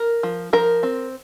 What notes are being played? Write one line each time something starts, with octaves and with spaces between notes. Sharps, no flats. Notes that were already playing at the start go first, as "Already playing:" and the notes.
Already playing: A#4
F3
F3 A#4
C4